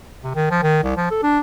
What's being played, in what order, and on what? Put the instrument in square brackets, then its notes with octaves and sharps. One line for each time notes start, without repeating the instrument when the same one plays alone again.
[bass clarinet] C3
D#3
F3
D#3
C2
F3
A4
D4